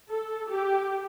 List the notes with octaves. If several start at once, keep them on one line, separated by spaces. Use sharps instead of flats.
A4
G4